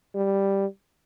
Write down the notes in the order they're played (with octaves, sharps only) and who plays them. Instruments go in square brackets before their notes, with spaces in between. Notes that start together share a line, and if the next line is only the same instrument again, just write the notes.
[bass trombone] G3